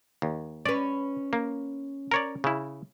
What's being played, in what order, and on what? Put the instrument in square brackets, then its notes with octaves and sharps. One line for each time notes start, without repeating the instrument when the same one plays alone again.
[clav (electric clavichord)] D#2
[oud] C#4 B4 [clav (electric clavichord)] D5
[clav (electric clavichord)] A#3
A#4 C#5 D5
C#3 E4